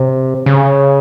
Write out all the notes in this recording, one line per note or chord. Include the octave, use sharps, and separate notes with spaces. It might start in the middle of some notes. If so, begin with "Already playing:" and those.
Already playing: C3
C#3